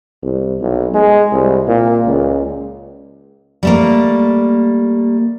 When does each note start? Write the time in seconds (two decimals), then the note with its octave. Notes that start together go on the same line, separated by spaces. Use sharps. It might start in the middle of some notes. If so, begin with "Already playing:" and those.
0.23 C2
0.60 B1
0.94 G#3
1.32 C2
1.68 A#2
2.06 C#2
3.63 G3 A3 A#3